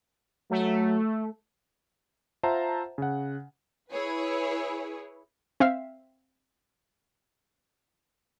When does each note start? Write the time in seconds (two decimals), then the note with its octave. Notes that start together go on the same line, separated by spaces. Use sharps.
0.51 F#3 A3
2.43 F4 C5 E5 F#5 A5 A#5
2.98 C#3 F#5
3.93 E4 G#4 B4 C#5
5.60 C4 E5 F5